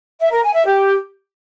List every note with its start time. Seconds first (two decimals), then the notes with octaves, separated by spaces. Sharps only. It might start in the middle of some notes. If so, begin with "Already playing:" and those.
0.20 E5
0.31 A#4
0.43 G#5
0.54 E5
0.65 G4